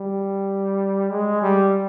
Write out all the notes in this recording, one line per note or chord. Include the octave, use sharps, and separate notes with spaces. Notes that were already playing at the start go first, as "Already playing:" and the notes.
Already playing: G3
G#3
G3